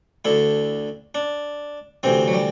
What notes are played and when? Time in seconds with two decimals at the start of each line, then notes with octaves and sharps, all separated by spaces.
0.25 D2 D3 E4
1.15 D4
2.03 D2 C3 E3 C4
2.27 F#3
2.33 G3